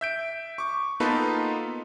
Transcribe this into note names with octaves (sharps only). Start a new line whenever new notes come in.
E5 G6 D7
C#6 D6
A#3 B3 D#4 F4 A4 B4